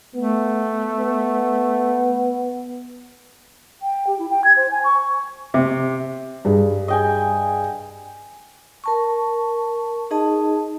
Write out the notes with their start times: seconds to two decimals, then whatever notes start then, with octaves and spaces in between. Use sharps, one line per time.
0.15 A3 B3
0.99 B3
3.82 G5
4.07 G4
4.19 E4
4.31 G5
4.44 G#6
4.57 C5
4.71 G#5
4.84 C#6
5.54 C3
6.45 G2 G#4
6.88 D#5 G5 G#5
8.84 A#4 A5 C#6
10.11 D#4 G#4 D#5 A5